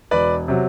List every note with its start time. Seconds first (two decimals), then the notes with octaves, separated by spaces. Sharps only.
0.11 E1 B4 D5
0.48 C3 F#3